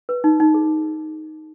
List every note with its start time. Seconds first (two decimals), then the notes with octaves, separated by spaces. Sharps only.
0.09 B4
0.24 D#4
0.40 D#4
0.54 G#4